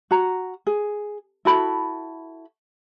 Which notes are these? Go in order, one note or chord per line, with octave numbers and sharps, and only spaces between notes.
F#4 A#5
G#4
E4 F#4 A4 B5